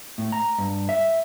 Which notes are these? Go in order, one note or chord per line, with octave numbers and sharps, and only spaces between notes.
A2
A#5
G2
E5